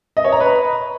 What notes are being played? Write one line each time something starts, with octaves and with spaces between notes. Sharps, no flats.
D#5
C#5
A#5
B4